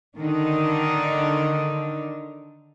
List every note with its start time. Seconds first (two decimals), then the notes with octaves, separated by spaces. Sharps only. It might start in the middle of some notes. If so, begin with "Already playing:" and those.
0.16 D3 D#3 D4 D#4